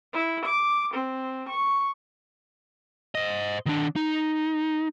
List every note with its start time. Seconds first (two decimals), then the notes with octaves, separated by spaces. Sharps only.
0.13 E4
0.45 D6
0.94 C4
1.48 C#6
3.15 C5 D#5
3.66 D#3 D4
3.96 D#4